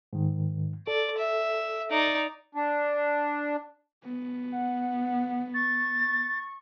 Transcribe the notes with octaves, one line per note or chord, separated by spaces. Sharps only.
G#2 D#3
A4 D5
E5
D#4 D5
D4
B3
F#5
C#6 A6